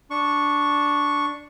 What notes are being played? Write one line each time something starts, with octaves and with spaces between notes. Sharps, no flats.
D4 C#6